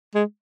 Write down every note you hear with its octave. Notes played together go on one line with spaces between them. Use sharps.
G#3